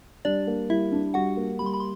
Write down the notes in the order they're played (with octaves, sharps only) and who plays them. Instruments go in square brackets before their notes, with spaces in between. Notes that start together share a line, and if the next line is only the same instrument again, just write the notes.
[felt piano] G3 [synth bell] D4 D5
[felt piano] A#3
[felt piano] G3 [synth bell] E4 E5
[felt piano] D4
[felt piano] G3 [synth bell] F#4 F#5
[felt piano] A#3
[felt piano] G3 [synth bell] B5
[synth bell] C6
B5
C6